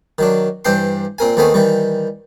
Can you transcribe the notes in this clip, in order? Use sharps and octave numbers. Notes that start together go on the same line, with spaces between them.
D#3 F#3 D4
G2 E3 D4 C5 G5 C6
A#2 C4 A#4 G#5
D#2 D#3 A3 B3 C4 G#5
D#3 E3 G3